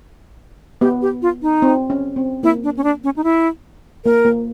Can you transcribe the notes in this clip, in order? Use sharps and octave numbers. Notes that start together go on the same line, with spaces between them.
B3 G4
G4
F4
D#4
C4
C#4
C4
A#3 E4
D4
C#4
D4
C#4
D#4
E4
A#3 A#4
A#3